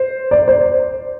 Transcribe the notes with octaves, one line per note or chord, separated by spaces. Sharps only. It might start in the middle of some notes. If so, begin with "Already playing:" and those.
Already playing: C5
D5
C5